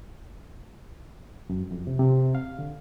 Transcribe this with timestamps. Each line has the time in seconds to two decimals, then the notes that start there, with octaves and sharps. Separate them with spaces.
1.50 F#2
1.71 F2
1.87 C3
1.99 C3
2.35 F5
2.59 D3